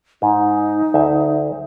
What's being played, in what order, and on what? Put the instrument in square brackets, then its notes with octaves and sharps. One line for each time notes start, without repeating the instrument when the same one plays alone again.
[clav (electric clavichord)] G#2 [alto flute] D#4
[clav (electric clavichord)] D2 E5